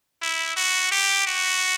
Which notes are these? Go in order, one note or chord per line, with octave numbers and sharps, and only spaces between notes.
E4
F#4
G4
F#4